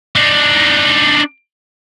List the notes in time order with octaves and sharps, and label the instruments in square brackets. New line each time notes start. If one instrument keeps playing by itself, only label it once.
[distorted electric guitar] D4 D#4